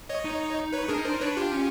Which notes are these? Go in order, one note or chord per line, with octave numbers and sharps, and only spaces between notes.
C#5 D#5
D#4
B4 C#5
D4 G#4 A#4
D#4
D4 A#4 C5
D#4
D4 B4 C#5
F4 G4
C#4